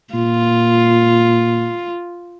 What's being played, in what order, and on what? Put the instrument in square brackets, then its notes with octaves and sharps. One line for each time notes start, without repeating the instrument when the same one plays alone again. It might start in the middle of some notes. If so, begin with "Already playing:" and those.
[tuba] A#2 [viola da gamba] F4